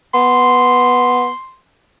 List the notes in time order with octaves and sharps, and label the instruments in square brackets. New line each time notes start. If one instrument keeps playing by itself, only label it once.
[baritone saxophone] B3 [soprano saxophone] C6